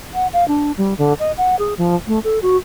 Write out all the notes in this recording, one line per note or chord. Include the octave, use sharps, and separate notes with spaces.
F#5
F5
D4
G3
D3
D#5
F#5
G#4
F3
A3
A4
F#4